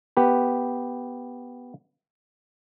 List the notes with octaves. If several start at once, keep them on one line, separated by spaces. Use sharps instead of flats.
B3 G4 B4